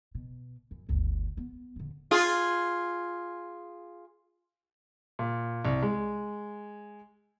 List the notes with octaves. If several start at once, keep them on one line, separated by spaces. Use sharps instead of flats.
B2
F#2
G1 D2
B3
D#1 D3
F4 G#4
A#2
C2
G#3